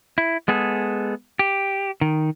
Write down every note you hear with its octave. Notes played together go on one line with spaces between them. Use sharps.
E4
G#3 B3 G#4 A4
G4
D#3